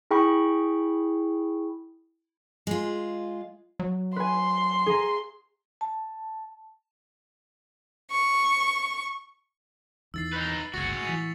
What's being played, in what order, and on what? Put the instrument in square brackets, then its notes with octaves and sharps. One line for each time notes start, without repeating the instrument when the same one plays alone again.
[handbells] E4 G#4 G5 B5 C#6
[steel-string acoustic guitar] G#3 F4
[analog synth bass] F#3
[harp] B4 G#5 [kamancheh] C6
[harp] G#4 A#5
[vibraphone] A5
[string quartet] C#6
[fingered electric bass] E2 D#3 [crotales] E6 A6 C7
[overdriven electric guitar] D#4 B4
[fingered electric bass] G1 C#2 [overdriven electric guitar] F#4 G#4 [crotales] A6 C#7
[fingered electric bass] A2 [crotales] C#6 F7
[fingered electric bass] A2 E3 [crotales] A6 B6